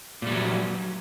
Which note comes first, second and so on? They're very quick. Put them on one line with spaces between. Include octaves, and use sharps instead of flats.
A#2 G3 F#3